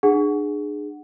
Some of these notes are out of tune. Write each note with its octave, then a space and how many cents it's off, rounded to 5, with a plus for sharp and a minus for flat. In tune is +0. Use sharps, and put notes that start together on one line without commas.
D4 +40 G#4 +0 F#5 +0